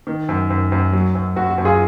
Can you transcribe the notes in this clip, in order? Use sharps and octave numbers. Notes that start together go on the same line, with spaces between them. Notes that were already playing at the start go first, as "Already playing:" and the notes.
D#3
F#2
F#2
F#2
F#3
F#2
F#2 F#4
F#4
F#2
F4 G#4